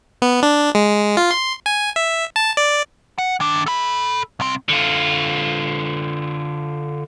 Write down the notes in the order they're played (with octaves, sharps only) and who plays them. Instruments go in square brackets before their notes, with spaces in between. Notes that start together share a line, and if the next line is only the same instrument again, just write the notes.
[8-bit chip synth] B3
D4
G#3
F4
C6
G#5
E5
A5
D5
[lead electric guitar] F#5
D#3 D4
A4 B5
C2 C4
[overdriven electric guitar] D3 F4